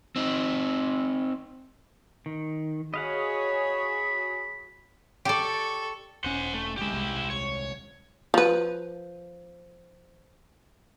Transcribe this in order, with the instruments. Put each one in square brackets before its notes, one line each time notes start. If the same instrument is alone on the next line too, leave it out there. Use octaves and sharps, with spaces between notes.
[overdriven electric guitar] C4 D#4
[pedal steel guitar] D#3
[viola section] F#4 G#4 C#5 [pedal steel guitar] D#5 F5 F#5 [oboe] B5
[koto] G4 D5 [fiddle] A4 C#6
[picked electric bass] E1 C#4 [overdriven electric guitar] C5 F#5
[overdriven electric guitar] A3
[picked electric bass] G1 G#3 [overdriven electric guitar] E4 G4
[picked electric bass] D#1 C2 G#3
[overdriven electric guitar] C#5
[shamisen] F3 B4